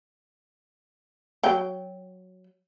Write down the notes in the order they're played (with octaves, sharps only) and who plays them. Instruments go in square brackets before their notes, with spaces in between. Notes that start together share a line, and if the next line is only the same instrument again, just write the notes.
[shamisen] F#3 G5